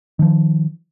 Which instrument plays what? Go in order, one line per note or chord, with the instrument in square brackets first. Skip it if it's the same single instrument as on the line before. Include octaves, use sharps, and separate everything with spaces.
[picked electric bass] D#3 F3